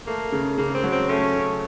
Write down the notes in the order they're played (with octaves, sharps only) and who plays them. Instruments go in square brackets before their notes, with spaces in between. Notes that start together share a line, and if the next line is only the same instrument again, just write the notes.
[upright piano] A3 [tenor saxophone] A#3
[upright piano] C#3
[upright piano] C#3 [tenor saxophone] A#3
[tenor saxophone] C4
[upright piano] F#3
[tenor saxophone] C4
[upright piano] A3 [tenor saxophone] C#4
[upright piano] C#3